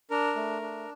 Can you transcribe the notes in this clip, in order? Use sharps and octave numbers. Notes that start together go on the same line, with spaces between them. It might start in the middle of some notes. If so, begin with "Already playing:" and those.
D4 A#4
A3
D4